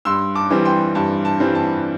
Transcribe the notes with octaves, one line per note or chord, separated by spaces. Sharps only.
G2 C6 E6
A5 D6
E3 G3 C4
G5 C6
G2 A5
A5
E3 G3 C4
A5